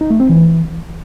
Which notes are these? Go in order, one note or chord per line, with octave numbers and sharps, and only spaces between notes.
D#4
A3
C4
E3